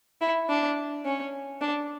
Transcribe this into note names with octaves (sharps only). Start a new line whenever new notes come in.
E4
D4
C#4
D4